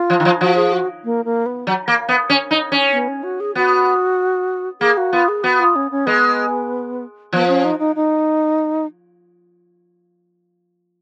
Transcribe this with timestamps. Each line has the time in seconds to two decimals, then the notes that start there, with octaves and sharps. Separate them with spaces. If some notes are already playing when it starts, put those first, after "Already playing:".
Already playing: F4
0.10 F3
0.20 D#3
0.25 F3
0.41 F3 F#4
0.56 G#4
0.73 F#4
1.04 A#3
1.25 A#3
1.46 B3
1.67 F#3
1.88 A#3
2.09 B3
2.30 C#4
2.51 D#4
2.72 C#4
2.92 B3
3.08 C#4
3.23 F#4
3.40 G#4
3.55 B3 F#4
4.81 A#3 G#4
4.97 F#4
5.13 B3 F4
5.28 G#4
5.43 B3 F#4
5.60 F4
5.76 C#4
5.91 C#4
6.06 G#3 B3
7.33 F3 B3
7.48 C#4
7.64 D#4
7.79 D#4
7.96 D#4